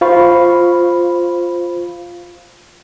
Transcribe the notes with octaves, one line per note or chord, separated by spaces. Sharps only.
F4 C5 F5 B5 C#6